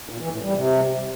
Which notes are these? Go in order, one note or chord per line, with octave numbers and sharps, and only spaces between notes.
A#2
E3
A2
G3
C3